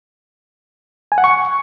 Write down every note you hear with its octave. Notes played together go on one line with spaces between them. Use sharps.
G#5
F#5
C#6